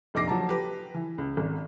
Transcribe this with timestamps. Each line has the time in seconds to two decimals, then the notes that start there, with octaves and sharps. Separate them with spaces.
0.14 F1 A#1 D#4 D6 A#6 C7
0.27 F3 F#3 A5 A#5
0.49 G4 B4
0.94 E3
1.18 C#2
1.37 G#1